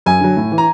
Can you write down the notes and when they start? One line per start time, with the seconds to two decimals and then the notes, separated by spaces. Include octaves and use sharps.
0.06 F#2 G#5
0.21 D3 F#3
0.37 A2
0.52 E3
0.58 A#5